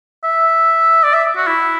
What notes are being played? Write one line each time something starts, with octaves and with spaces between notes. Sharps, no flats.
E5
D5
E5
F#4
E4